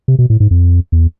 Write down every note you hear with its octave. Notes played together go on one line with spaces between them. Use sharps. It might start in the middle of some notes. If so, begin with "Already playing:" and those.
C3
B2
A2
G#2
F2
E2